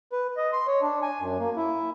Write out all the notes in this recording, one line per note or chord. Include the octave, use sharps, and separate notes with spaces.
B4
D#5
C6
C#5
D4
G#5
F#2
A#3
E4